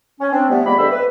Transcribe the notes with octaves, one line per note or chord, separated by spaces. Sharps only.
C#4
C4 D4
F3 G3 A3 B3
G3 G#3 A#3 B5
G2 D3 C5 E5
B4